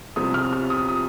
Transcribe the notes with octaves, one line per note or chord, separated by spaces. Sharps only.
C2 C3 F3 C4 D#6
F6
F6
D#6
D#6